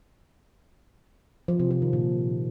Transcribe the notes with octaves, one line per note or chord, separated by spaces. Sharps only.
F3
C3
F3
D#3
A#2